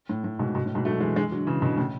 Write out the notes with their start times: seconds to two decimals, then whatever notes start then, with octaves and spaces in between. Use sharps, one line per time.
0.09 A2
0.24 A2
0.39 G#2 B2
0.55 G#2 B2
0.66 A2
0.75 G#2 B2
0.85 F#3 A3
1.00 E3 G#3
1.16 E3 G#3
1.32 D3 F#3
1.47 C#3 E3
1.62 B2 D3
1.77 A2 C#3